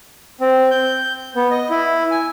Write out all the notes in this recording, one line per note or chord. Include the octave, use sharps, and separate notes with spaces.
C4
G6
B3
D#5
E4
G#5